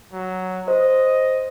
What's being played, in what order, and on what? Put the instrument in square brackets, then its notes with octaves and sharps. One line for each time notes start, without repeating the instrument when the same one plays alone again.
[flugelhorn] F#3
[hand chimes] C5 [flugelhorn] D#5